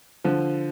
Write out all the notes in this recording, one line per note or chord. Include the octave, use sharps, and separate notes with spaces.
D3 F3